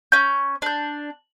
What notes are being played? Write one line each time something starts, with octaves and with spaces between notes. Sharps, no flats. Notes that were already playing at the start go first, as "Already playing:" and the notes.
C#4 G6
D4 G6